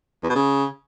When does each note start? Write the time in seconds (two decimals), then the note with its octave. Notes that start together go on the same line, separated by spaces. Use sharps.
0.23 E2
0.29 B2
0.35 C#3